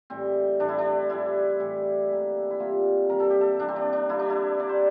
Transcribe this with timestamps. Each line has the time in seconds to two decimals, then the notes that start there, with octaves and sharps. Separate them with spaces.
0.10 A2 E3 G3 C4
0.60 A2 E3 G3 D4
0.69 E4
0.79 D4
1.10 A2 E3 G3 E4
1.60 A2 E3 G3
2.10 C3 E3 G3 A#3
2.50 E4
2.60 C3 E3 G3 A#3 F4
3.09 C3 E3 G3 A#3 A#4
3.20 A4
3.30 G4
3.41 A4
3.59 C3 E3 G3 A#3 D4
3.68 C4
3.76 D4
3.93 D4
4.09 D3 G3 A#3 E4
4.19 D4
4.30 E4
4.59 D3 G3 A#3 D5
4.69 C5